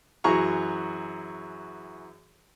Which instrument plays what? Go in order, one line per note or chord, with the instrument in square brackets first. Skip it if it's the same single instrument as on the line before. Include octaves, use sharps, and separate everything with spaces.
[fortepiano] F#2 E3 F#4 G#4 A#5 C#6